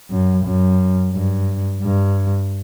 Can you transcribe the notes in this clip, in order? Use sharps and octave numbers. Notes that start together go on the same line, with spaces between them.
F#2
F#2
G2
G2